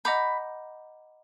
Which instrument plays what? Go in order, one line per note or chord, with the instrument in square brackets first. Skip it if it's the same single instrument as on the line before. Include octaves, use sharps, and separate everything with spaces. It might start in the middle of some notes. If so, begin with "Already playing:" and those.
[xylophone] D#5 F#5 A#5 D6 G6 [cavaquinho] B5